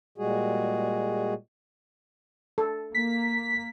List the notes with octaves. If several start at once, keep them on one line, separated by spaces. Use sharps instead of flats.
A#2 G3 G#3 F#4 G#4
A4
A#3 B6